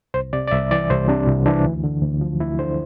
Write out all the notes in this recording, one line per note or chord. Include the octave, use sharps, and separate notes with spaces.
C2 C5
C3 D5
D5
C2 E5
E3 D5
C2 C5
C3 D4
C2
E3 D4
D2
D3
D2
F3
D2 E4
D3 C5